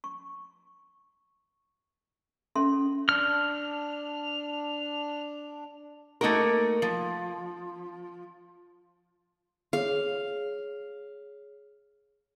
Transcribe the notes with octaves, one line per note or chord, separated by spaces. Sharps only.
C#6
C#4 A4 E5 C6
D4 F6
A3 A#3 D#4 F#4 A#4
F3
G#4 C#5 F5